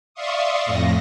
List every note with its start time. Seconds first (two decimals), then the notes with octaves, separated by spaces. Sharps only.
0.14 D5 E5 F5 C6 C#6 D#6
0.65 F2 A2 A#6